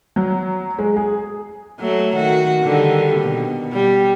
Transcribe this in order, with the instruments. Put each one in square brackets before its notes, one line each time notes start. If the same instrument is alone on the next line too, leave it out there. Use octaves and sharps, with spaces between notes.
[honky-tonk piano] F#3
G#3
G#4
[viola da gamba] F#3 A3
D#3 F#4
D3 D#3 G3
B2
G3